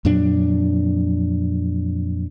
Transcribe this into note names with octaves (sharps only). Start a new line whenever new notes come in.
F2 A#2 F#3 D4